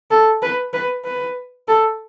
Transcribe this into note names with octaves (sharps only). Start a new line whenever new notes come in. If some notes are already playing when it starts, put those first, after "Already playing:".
A4
B4
B4
B4
A4